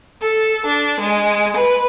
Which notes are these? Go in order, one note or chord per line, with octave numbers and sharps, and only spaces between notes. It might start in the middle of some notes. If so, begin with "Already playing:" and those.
A4
D4
G#3
B4